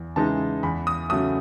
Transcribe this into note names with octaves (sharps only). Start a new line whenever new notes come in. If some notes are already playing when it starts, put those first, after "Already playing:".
Already playing: E2
C#3 E3 G#3 D#4 A5
E2 B5
D#6
C#3 F#3 A3 D#6